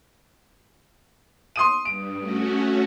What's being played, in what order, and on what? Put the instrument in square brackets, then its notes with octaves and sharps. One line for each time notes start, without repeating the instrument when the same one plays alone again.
[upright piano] C6 D#6 D#7
[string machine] G2 [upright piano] D7
[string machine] A3 C#4 F#4